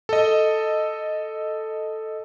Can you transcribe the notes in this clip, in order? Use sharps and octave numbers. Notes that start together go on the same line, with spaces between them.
A4 D#5